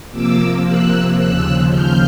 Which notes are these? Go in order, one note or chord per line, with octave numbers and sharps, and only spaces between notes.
C3 F3 A#3 D6 E6
E6 F#6
D#2 C#3 F3 E6 F#6
F6 G6